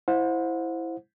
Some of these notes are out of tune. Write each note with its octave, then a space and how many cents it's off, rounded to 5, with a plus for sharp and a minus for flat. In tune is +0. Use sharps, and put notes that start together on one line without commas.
E4 +0 C5 +5 F#5 -35